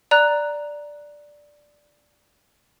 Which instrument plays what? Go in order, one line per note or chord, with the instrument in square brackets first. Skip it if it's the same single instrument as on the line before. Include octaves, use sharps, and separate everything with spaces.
[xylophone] D5 A#5 F#6